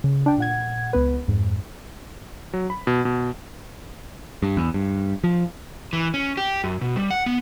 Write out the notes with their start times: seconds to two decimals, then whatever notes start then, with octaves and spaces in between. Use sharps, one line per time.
0.04 C#3
0.26 D4 G5
0.38 A#2 F#5 G#6
0.93 C#2 B3 B4
1.28 F2 G#2
2.53 F#3
2.70 B5
2.87 B2
3.05 B2
4.43 G2
4.57 E2
4.74 G2
5.24 F3
5.93 E3
6.14 C#4
6.37 G4
6.64 F#2
6.81 B2
6.96 G3
7.11 F#5
7.26 B3